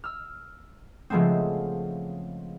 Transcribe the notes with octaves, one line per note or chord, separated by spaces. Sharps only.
E6 F6
C#3 F3 G#3 A3 B3 C4